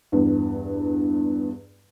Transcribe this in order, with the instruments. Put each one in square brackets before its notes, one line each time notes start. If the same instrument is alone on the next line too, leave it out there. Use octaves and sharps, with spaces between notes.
[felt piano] E2 G2